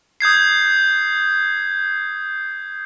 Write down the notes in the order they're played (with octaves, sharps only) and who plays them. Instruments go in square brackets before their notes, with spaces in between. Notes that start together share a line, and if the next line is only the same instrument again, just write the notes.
[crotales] D#6 G6 G#6 C7